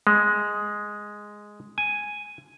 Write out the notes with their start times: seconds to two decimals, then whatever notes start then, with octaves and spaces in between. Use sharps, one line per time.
0.07 G#3
1.78 G#5